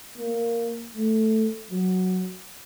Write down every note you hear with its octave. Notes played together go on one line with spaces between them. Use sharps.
A#3
A3
F#3